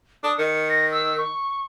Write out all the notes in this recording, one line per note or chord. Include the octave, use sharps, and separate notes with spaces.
D4 D#6
D#3 C#7
A#6
E6
C#6